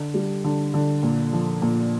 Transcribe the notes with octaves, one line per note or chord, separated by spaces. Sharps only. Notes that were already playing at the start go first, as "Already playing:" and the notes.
Already playing: D3
G3
D3
D3
A#2
F3
A#2